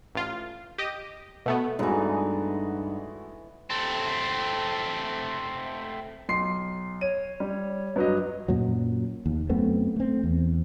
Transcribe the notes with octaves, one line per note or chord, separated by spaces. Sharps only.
A1 F4
G4 D#5
B2 A3 B3
G2 E3 G#3 A3 B3 D#4 F#4
A3 C4
B1 C6 C7
C#5 D#7
G3
G2 F#3 B4 D#5
F#2 A#2 F#3
D#2
F#2 A3 B3 C4
A3 C4
E2